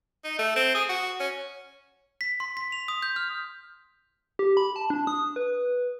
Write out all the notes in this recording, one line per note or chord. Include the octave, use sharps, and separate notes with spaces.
D#4
A3
C4
G#4
F#4
C#4
B6
C6
B6
F7
D#6
G6
F6
G4
B5
A5
D4
D#6
B4